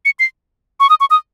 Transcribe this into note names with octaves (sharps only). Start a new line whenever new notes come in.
C#7
C7
C#6
D#6
C#6
D#6